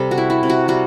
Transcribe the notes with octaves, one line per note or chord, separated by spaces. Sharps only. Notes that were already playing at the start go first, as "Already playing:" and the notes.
Already playing: C3 G3 C4 A4
F#4
E4
E4
C3
F#4
G3 F#4